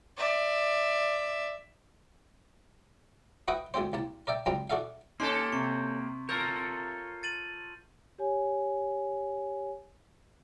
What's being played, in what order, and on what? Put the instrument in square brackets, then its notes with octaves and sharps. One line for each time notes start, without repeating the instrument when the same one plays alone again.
[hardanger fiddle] D5 E5
[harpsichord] F#4 B4 D#5 E5 G5 D#6
D2 D#3 G#3 C4 C5
C2 A#3 A5
A#4 D5 E5 G5
C#2 F#2 G3 C4 A#5 C6
D4 F#4 G#4 A4 E5 F5
[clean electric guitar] A#3 G4 [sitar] C#4 A4 [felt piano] D#4 [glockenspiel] C6
[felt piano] C3 [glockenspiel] C#6
[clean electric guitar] F4 A4 C#5 [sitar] A#4 [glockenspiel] G6
[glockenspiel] A6 D#7 F#7
[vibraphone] G4 C#5 G#5